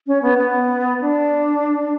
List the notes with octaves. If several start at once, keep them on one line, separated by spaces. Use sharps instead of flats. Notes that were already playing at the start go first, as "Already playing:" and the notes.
C#4
B3
B3
D4